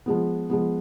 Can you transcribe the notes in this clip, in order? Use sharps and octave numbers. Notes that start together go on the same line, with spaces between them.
F3 G#3 B3
F3 G#3 B3